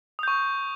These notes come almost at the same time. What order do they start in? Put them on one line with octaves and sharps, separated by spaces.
D#6 G6 C#6